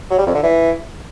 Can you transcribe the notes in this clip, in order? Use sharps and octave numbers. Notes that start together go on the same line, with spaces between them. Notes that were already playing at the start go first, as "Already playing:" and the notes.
F#3
G3
F2
D3
E3